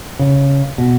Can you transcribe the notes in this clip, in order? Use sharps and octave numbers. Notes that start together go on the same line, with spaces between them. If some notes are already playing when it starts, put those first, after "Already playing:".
C#3
B2